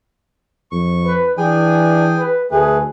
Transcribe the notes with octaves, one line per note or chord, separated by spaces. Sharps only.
F2 C#6
B4
E3 D4 G#4 G5 G#5
B4
D2 A3 G#4 B4